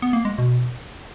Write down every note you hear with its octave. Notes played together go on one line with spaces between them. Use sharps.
B3
A#3
G#3
B2